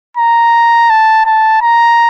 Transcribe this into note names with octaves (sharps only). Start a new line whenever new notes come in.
A#5
A5
A5
A#5